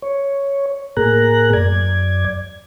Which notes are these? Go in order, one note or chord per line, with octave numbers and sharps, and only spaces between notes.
C#5
A2 A#3 G#4 A#4 A#5 F#6
F#2 D5 G#6